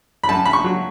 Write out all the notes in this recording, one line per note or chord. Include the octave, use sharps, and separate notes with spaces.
B5
F#2 A5
B5
C#6
F#3